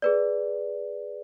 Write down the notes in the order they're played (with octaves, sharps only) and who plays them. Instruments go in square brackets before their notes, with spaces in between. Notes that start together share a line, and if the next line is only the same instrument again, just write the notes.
[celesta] G#4 B4 D5